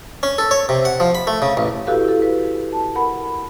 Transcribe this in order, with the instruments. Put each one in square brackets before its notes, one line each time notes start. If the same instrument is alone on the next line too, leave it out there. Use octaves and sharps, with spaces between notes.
[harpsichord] C#4
A4
C#5
C3
F#5
F3
B5
A3
C#3
A1
[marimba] E4 F#4 G4 A4 B4 F5
E4 A4
B4
A5
A#4 F#5 B5